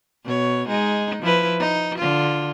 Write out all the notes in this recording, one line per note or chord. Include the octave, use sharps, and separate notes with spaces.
B2 C#5
G#3 D#4
F3 E4 B4
D#4
D3 F4